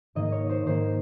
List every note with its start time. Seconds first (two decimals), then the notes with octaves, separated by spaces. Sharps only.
0.15 G#2 D#3 A#3 D#5
0.32 C#5
0.50 C5
0.66 G#2 D#3 A#3 C5